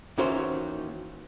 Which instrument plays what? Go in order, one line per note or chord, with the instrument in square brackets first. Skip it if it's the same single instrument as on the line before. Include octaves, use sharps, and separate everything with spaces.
[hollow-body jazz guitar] D#2 D#3 E3 C#4 F#4 C5